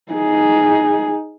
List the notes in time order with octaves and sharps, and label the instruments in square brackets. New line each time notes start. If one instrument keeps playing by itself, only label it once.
[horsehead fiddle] D#4 G#4